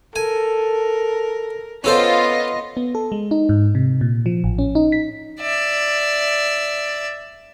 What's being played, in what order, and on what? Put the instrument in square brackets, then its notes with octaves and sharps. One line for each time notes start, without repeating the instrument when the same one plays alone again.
[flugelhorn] A4 [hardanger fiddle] A#4 [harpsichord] G#5
[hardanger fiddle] B3 D#5 [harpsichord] C#4 A4 C5 [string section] F4
[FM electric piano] B3
A4
G#3
D#4
G#2
C3
A#2
F3
A1
C#4
D#4
B6
[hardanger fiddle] D5 E5